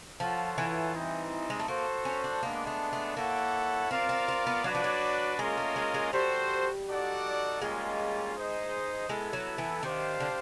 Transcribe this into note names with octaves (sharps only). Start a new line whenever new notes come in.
F3 F4 A4 C#5 F#5
E3
G3 C4 D#4
G#3
A3
A#3 F#4 A4 C5
C#4
D4
G#3 A#3 B3 D4
A3
A3
A#3 E4 A4 C#5 F#5
C4 F4 A#4 D5 F5
C4
C4
B3
F#3 D4 F#4 B4 D5
F3
F#3
G#3 A#3 C#4 F4 A#4 D#5
A3
G#3
G#3
G3 F#4 A4 C5
D#4 F#4 A4 D5 F#5
G3 G#3 A#3 C#4 F4
D#4 G#4 C5 D#5
G#3 B3 E4 A4
F#3
E3
D#3 D4 G4 C5 F5
D3